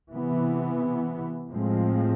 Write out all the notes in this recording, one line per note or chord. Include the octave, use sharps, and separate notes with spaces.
C3 E3 B3
A2 F3 G#3 C4